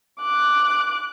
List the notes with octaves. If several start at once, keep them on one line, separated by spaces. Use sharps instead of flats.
D6 F#6